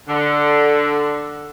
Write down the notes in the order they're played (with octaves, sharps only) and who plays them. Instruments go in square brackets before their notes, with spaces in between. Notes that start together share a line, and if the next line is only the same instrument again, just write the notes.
[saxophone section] D3